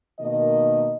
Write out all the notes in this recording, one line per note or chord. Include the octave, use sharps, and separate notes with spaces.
B2 D#3 A#3 D#5